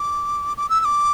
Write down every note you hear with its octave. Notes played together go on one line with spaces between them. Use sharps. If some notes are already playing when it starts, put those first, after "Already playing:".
Already playing: D6
D6
E6
E6
D6